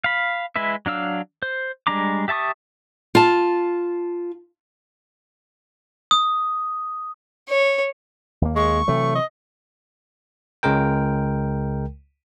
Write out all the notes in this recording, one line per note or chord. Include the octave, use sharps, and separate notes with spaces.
F5 B5
G#3 E4 B4 E5
F#3 D4 F5 E6
C5
G3 G#3 D4 A#5 D6
G4 E5 A5 C#6 D#6
F4 A5
D#6
C#5
D#2 A#3
G#3 C#6
C3 E3 F#3 A3
D#5
C#2 C#3 G#3 A#4 G5